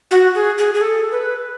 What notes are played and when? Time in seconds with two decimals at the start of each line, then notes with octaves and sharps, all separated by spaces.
0.11 F#4
0.35 G#4
0.58 G#4
0.74 G#4
0.81 A4
1.12 B4